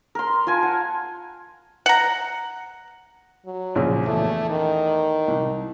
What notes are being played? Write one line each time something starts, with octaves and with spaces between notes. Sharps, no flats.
A#4 C6
F4 A#4 G#5 A5
F#5
F#5 A#5
F#3
A#1 F#2 C#3
E2 A3
D#3
C2